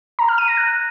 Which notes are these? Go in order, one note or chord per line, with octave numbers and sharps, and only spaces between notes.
A#5
F6
D#7
A#6
F#6